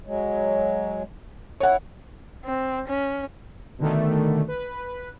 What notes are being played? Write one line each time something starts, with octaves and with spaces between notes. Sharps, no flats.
F#3 G#3
E4 C#5 F#5
C4
C#4
B2 D3 D#3 A3
B4